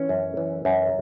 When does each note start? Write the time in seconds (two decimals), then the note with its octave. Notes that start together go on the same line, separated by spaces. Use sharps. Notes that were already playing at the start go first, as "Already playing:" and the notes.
Already playing: E3 C#4
0.09 F#2
0.37 E3
0.65 F#2